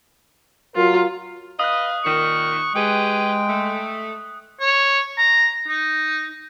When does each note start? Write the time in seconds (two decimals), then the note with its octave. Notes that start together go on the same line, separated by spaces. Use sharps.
0.76 F#3 F4 A#4
1.59 B4 D#5 F5 D#6 F#6
2.05 A#2 D#3 C#6
2.75 G#3 G4 G#4 B4 G5
3.48 A3
4.60 C#5
5.18 A#5
5.68 D#4